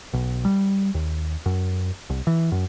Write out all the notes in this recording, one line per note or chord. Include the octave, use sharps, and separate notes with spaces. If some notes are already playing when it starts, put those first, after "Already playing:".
B1
G3
D#2
F#2
C2
E3
F#2